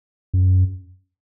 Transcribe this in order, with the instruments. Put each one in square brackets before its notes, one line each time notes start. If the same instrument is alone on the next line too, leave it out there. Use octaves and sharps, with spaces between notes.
[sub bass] F#2